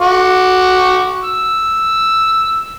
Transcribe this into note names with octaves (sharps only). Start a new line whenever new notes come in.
F#4 C#6 D6
E6